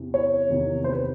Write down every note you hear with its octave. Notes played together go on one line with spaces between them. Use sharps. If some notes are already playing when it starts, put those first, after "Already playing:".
Already playing: E2 C3
C#5
E2 C3 D#3
C5
B4